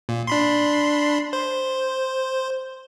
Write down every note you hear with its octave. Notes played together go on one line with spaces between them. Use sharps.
A#2
D4 B5 C6
C5